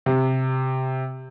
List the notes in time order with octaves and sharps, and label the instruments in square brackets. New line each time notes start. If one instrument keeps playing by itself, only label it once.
[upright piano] C3